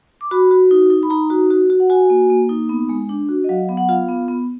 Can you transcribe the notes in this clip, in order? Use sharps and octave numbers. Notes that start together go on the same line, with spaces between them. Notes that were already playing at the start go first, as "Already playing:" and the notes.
D6
F#4 B5
F#4
D#4
D#4
B5
D#4 A#5
F#4
F#4
F#4
F#5
F#4 G#5
A#3
A#3
D#4
B3
G#3
D4
F#4
D#5
F#3 F5
B3
F#5
F4 F5
B3
B3